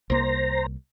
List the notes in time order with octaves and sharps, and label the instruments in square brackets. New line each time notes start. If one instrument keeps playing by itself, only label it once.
[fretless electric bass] C2 A#3 [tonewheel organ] C5 A#5